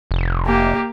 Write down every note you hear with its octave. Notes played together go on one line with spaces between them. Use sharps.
F1
A#3 G4